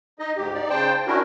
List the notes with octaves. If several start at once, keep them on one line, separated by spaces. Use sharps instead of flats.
D#4 D#5
D2 G#2 G4
D#4 D5
C#3 C5 G5 A5
C#4 D4 E4 F#4 A#4